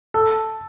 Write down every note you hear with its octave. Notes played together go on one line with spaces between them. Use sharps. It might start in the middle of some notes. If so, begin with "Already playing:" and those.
A4